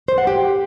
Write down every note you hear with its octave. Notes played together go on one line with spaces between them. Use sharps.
C5
F#5
G4